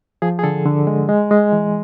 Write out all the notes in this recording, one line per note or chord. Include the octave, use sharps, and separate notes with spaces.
F3 G#4
G#4
D3 A4
D3
G#3
G#3
G#3
E3